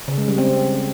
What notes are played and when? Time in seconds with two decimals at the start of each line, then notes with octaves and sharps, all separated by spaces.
0.08 C#3
0.18 G#3
0.28 G3
0.38 C4